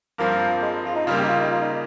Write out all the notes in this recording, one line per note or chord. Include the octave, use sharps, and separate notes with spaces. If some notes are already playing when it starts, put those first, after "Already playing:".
G2 F3 A#3 C4
G#3
F4
D#4
C#3 G3 A#3 F4
G4
D#4
F4
D#4
F4
D#4